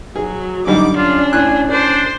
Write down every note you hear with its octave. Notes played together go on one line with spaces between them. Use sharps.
F#3 G#4
F#2 D3 G3 D#4 D6
C#4 D4 F4
A2 G#5 F#6
D4 C5